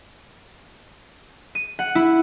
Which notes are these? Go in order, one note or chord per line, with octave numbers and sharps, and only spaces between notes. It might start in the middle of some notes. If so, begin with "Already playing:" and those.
D#7
F#5
E4